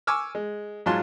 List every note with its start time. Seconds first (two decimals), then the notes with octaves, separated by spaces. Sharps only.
0.07 G#5 C#6 D6 E6 F6
0.35 G#3
0.86 G#2 F#3 F4 A5 C6